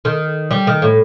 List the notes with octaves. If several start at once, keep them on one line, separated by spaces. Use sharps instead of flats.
D#3
G3
D#3
A2